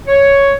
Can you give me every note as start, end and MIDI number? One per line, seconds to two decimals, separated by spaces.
0.08 0.54 73